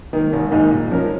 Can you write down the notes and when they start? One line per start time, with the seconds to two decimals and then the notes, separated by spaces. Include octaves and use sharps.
0.13 D#3 A#3
0.33 G#1
0.52 G#2 D#3 A#3 D#4
0.71 A#2
0.91 F3 C#4 A#4